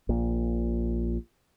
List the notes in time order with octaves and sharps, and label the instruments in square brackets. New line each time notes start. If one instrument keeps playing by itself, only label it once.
[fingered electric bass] A#1 A#2